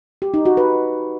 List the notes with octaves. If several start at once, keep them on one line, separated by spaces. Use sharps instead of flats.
G4
D#4
F#4
B4